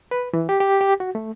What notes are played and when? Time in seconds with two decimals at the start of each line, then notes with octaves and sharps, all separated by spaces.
0.11 B4
0.33 E3
0.49 G4
0.60 G4
0.81 G4
1.00 F#4
1.15 A3